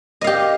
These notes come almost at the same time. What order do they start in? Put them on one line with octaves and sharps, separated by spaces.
D#5 F5 G4